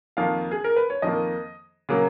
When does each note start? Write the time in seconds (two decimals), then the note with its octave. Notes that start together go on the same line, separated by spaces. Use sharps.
0.17 F2 D#3 A#3 F5
0.51 G#4
0.64 A#4
0.76 B4
0.90 C#5
1.02 F2 D#3 A#3 D#5
1.89 C#3 F#3 A#3